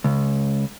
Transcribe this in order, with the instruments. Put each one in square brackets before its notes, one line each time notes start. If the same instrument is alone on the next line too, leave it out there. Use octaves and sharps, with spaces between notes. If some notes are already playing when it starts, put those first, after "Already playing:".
[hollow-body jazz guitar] C#2